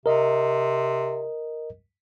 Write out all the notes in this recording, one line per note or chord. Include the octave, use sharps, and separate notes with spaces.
C3 A#4 D#5